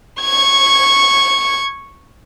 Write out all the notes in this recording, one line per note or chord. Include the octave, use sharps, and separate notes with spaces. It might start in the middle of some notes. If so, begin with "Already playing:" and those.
C#6 G#6